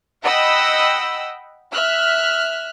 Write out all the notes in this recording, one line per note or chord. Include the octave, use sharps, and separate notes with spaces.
D#5 F#5 G5 B5 E6
E5 F6 F#6